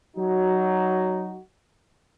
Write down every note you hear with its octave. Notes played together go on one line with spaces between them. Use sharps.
F#3 D#4 F#4